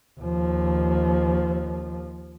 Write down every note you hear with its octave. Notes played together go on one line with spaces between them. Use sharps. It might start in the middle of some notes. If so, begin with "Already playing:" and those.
D#2 F3